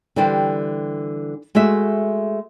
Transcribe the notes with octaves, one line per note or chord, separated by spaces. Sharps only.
D3 E3 G3 G4 C5
G#3 A3 F#4 E5